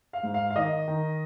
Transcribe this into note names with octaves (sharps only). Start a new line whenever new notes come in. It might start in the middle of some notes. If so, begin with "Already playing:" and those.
F5
G#2
F5
F5
D#3 D#5
D#3